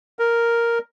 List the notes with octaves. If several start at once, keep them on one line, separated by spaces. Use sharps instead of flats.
A#4